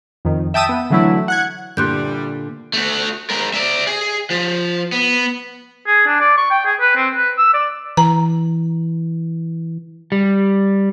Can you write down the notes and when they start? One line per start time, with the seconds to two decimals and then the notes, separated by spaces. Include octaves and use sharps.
0.25 F2 D#3
0.54 E5 G5 A5 D#6 E6
0.69 B3
0.90 D3 E3 F#3 A3 E4
1.28 F#5 F#6 G#6
1.77 A#2 D3 E3 G3 C6 F#6 G6
2.73 A3 F#4
3.30 G#3 A#4
3.54 D5 E5
3.87 G#4
4.30 F3
4.92 B3
5.87 G#4
6.07 D4
6.20 D5
6.37 C#6
6.51 G5
6.65 G#4
6.80 B4
6.96 C4
7.15 B4
7.38 E6
7.54 D5
7.97 E3 A#5
10.12 G3